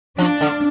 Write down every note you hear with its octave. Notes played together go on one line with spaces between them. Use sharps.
F3 D4
D3